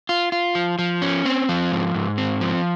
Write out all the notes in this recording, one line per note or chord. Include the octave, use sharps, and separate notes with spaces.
F4
F4
F3
F3
C#4
C4
F3
G#2
G#2
C4
F3